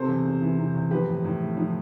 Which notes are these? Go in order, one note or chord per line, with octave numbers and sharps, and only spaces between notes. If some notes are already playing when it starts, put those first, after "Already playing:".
Already playing: C3 A4 C5
E2
E2
E3
C3
E2
F3 G4 B4
A2
A2
A3
F3